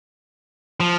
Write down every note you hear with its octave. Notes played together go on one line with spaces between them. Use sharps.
F3